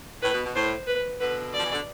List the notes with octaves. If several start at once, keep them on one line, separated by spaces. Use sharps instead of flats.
A2 B4
B2
B2
A2 C5
B4
B2 D3 B4
F3 D5
E3
D3